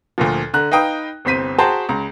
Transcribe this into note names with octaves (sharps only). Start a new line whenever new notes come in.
D2 A#2 F3
D3 A#5 F#6
D#4 B4 F5 G5 A#5 D#6
G1 C2 C4 B6 D#7
F#4 G#4 C5 G5 A5 A#5
C#2 A#5